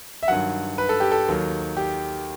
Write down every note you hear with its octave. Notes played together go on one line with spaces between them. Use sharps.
E5
G2 D#3 F#3 F#5
B4
A4
G4
A4
D#2 D#3 F#3
G4